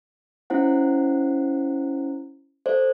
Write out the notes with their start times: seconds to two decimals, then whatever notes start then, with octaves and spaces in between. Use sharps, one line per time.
0.50 C#4 E4 C5 F#5
2.66 A4 C5 D5